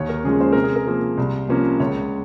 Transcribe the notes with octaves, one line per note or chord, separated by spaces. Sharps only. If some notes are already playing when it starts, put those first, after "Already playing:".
Already playing: D#2 C#5
A#4
C#3 F3 G#3 C#4 G#4
C5
C3 A#4
G#4
A#4
F3 A#3
C2
C3 F3 A#3 C#4
C#2 C#5